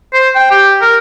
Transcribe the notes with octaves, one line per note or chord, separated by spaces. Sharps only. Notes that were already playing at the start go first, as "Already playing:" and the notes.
C5
G5
G4
A#4